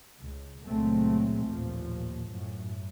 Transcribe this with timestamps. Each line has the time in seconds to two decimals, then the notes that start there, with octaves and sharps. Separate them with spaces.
0.20 C#2
0.67 C#2 A#2 F#3 G#3 A3 C4
1.46 A1 D#2 A#2 F3
2.28 F#2 A2